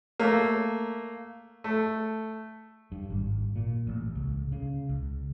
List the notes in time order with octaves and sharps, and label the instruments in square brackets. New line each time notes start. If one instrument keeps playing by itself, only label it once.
[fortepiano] A3 A#3
A3
[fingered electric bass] G2
G#1
A#2
A1
C#2
C#3
C#2